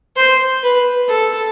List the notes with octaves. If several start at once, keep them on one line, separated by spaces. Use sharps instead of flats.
C5
B4
A4